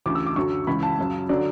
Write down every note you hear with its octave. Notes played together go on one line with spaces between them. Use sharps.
D2 C#3 E3 D6
E6
D6
F#2 D3 F#3 C#6
C#2 C#3 E3 B5
A5
F#2 C#3 F#3
D3 F#3 D5